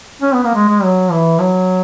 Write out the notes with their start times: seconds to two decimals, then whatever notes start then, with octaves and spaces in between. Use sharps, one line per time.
0.22 C#4
0.33 B3
0.43 A#3
0.55 G#3
0.68 G#3
0.83 F#3
1.11 E3
1.39 F#3